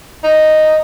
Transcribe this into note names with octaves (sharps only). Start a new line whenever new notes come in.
D#4